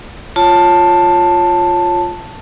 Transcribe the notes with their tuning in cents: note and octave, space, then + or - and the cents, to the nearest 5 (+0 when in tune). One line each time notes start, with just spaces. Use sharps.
F4 +0 C#5 -5 A5 +5